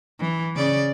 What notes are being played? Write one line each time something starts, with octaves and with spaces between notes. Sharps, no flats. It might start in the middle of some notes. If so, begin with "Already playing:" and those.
E3
C#3 D5